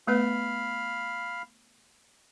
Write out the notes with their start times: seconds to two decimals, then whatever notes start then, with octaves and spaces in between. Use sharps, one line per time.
0.07 A3 B3 B4 F5 B5 F6